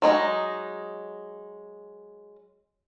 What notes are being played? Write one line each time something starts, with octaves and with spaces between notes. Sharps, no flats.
F#3 G#3 D#4